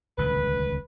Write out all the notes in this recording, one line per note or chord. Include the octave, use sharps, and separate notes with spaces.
D#1 C#2 D3 B4